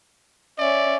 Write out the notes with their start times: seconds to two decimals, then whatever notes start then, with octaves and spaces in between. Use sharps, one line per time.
0.59 C#4 D5 E5